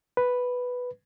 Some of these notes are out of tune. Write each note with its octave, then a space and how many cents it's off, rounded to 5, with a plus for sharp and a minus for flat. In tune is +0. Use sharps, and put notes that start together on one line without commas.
B4 +0